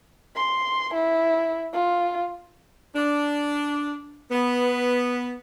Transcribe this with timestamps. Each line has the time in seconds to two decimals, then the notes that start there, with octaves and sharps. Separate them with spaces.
0.36 C6
0.94 E4
1.73 F4
2.96 D4
4.31 B3